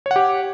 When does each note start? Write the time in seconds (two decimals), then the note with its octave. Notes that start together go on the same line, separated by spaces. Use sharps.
0.06 C#5
0.11 F#5
0.16 G4